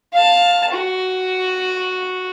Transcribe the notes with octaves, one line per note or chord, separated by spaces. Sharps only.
F5 A5
F#4